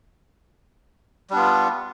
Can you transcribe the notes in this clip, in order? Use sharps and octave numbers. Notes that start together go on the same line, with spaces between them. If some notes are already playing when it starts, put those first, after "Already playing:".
G3 B3 D4 F4